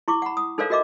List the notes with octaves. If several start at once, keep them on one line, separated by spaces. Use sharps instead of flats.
E4 C#6 D6
F#5 B5
D#6
D#4 A4 A#4 C5 D5 F5
F#4 A#4 D#5 E5 D6